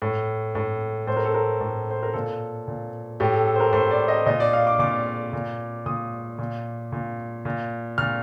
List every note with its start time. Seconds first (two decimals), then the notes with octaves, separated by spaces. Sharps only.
0.02 A2
0.55 A2
1.07 A2 C5
1.17 A#4
1.25 A4
1.34 A#4
1.61 A2
1.90 C5
2.03 A#4
2.13 A#2 A4
2.68 A#2
3.20 A2 G4
3.33 A4
3.47 A4
3.55 C5
3.60 A#4
3.73 A2 C5
3.91 D5
4.08 D#5
4.26 A#2 D#5
4.40 D5
4.53 F5
4.67 D6
4.79 A#2 D6
5.33 A#2
5.86 A#2 D#6
6.39 A#2
6.92 A#2
7.45 A#2
7.98 A#2 F6